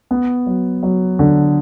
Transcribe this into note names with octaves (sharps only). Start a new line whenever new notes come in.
B3
F#3
F#3
D3